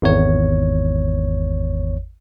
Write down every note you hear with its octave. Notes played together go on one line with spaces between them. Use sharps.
G#1 E2 C#5